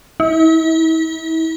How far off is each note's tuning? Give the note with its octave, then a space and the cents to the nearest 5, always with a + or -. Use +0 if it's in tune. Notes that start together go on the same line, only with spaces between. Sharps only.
E4 -40